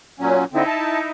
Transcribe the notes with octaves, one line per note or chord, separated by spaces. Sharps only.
A#2 F#3 C#4
D3 C4 D#4 E4
A5